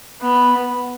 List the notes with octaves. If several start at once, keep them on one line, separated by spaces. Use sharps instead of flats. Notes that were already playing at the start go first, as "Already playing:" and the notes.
B3